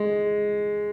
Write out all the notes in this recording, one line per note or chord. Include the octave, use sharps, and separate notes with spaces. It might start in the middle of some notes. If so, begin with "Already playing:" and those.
Already playing: G#3